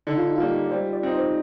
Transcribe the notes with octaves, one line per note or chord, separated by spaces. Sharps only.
D3 D#4
F4
D#4
G3 A#3 F4
D#4
D5
G3 C5
D5
C4 D#4
C5